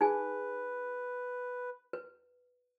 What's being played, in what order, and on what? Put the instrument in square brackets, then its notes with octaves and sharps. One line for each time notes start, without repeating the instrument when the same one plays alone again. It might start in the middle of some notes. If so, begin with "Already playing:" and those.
[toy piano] D#4 G#4 G#5 [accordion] B4
[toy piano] B4